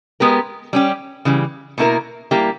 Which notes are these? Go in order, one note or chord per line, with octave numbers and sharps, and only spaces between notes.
G#3 B3 G4 A#4
G3 C#4 G4
C#3 E3 G3
B2 A#3 E4 A#4
G3 A#3 E4 G4